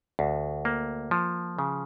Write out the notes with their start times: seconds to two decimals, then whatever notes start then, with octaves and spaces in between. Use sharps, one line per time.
0.19 D2
0.65 A#3
1.11 F3
1.58 C#3